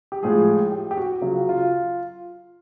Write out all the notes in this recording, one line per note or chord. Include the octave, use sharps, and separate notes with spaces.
G4
A2 F3 G#3 G#4
G4
G4
F#4
C#3 F#3 F4
F#4
F4